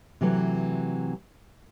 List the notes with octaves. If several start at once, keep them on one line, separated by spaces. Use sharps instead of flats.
C3 E3 F#3 A3